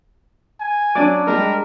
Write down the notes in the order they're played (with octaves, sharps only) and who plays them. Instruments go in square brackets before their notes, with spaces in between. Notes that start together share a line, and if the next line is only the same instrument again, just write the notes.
[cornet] G#5
[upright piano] F#3 C#4 D#7 [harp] D4 D5 D6
[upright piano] G3 G#3 [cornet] A#4